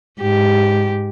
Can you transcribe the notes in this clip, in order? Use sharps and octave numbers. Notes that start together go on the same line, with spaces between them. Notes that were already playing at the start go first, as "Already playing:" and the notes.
G#2 G4